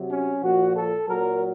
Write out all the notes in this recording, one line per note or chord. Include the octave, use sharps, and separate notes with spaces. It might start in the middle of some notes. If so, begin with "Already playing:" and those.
Already playing: C3 F#3
C#4
A#2 F3 F#4
A4
A#2 F#3 A#4